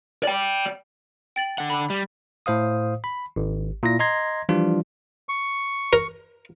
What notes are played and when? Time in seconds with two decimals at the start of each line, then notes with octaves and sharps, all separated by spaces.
0.23 D5 G5
1.36 G5 A6 F#7
1.58 D3 F#5
1.70 B5
1.90 G3
2.46 A2 C5 F5 D#6
3.04 B5
3.36 G#1
3.83 A#2 E4 A#6
3.99 D#5 A#5 C6 G#6 A#6
4.49 E3 F3 G3 D4 F4
5.29 C#6
5.93 A#4